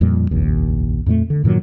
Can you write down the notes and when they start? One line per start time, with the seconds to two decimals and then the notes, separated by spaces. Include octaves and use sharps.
0.01 F2 A#2 G3
0.31 F1 A#1 D#2
1.06 F2 A#2 G#3 A3
1.30 D3
1.44 G2 A#2 D#3 F#3